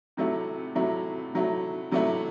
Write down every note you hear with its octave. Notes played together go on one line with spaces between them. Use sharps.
C3 F#3 A3 E4
C3 F#3 A3 E4
C3 F#3 A3 E4
C3 F#3 A3 E4